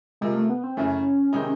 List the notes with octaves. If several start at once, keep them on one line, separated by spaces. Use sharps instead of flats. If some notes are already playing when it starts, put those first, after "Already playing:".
C3 F3 G#3 A#3
A3
B3
C4
F#2 C#3 E3 A3 C#4
C3 D#3 G#3 C4 D#4